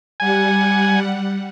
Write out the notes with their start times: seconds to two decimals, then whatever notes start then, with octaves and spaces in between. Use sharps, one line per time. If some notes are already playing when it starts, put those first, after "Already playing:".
0.20 G3 F#5 G#5